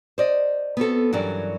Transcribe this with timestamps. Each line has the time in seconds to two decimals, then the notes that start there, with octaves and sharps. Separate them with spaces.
0.18 C5 D5 D#5
0.77 B3 C4 F#4 A4
1.13 G2 E3 F#3 C#4 A#4 D5